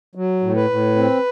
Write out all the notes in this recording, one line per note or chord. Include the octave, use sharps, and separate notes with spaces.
F#3
A2
B4
A2
C4